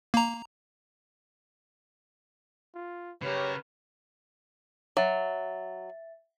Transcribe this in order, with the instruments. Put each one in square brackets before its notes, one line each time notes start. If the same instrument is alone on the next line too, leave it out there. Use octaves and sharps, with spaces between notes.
[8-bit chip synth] A#3 A#5
[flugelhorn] F4
[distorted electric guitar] C#3 A#4 [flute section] G4 C#5 [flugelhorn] B4
[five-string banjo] F#3 [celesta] E5 A6